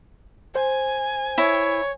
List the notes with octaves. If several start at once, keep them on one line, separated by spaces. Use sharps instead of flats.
C5 G#5
E4 C#5